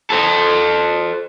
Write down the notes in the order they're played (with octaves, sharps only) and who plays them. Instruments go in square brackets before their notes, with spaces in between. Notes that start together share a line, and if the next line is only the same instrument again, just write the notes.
[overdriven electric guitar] A4 C5